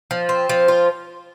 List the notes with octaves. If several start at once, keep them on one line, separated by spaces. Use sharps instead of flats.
F3
C4
F3
F4